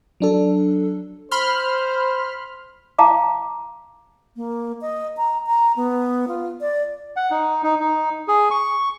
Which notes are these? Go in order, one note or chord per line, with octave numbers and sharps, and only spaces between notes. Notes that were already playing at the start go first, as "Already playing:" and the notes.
F#3 D4 A4
C5 B5 C6 F6
F5 A5 A#5 D6
A#3
D#5
A#5
A#5
B3
F4
D5
F#5
D#4
D#4
D#4
G#4
C#6